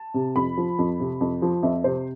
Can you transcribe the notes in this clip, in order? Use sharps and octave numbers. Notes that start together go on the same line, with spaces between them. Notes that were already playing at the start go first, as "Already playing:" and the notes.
Already playing: A5
C3
F2 B5
F3
F2
C3
F2
F3
F2 E5
C3 C5